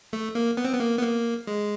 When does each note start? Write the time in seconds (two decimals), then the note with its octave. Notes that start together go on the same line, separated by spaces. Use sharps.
0.13 A3
0.35 A#3
0.57 B3
0.65 C4
0.73 B3
0.80 A#3
0.98 B3
1.03 A#3
1.47 G#3